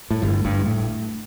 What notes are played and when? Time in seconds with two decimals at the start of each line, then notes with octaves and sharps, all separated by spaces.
0.10 A2
0.22 G1 G2
0.44 G1 G2
0.66 A2